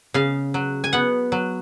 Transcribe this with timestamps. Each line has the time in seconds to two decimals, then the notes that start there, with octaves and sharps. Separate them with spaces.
0.14 C#3 F5
0.54 F#3
0.84 G#5
0.93 B3 F#5
1.32 F#3